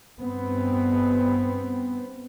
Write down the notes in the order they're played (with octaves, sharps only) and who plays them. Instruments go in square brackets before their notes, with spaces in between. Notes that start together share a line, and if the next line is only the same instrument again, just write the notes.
[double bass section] G2 B3 C4